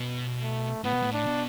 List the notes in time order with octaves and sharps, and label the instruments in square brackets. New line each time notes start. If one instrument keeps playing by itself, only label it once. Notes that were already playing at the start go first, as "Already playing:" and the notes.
Already playing: [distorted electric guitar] B2
[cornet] A3
[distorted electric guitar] A2 [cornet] B3
[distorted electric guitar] B2
A2
[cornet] D4
[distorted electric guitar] B2